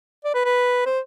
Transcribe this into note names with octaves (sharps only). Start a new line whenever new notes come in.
D5
B4
B4
C5